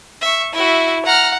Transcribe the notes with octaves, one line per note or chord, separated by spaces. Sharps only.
E5 C#6
E4 F#4 E5
F#5 A#5 F6